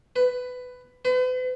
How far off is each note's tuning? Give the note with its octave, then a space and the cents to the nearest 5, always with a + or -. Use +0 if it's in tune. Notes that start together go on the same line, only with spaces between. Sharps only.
B4 +15
B4 +45